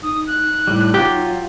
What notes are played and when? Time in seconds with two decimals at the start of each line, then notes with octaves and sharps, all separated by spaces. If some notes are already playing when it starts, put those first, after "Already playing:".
0.03 D#4 D#6
0.27 F#6
0.67 A2 G3
0.94 F#3 F4 G4